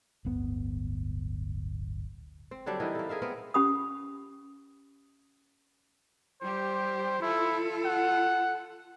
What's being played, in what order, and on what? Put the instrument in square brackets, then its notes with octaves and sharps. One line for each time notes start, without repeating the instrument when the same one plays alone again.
[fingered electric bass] D1 G1 B3
[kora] C4
D3 F#3 G3 D4
E3 D#4 E4 A#4
A#3 A4
G#4 A#4 E5 F5
B3 C4 A#4
[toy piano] C#4 G4 B5 D#6
[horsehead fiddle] G3 G4 [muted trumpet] C5
[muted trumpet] E4 [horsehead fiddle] F4 A4
[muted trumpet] F#5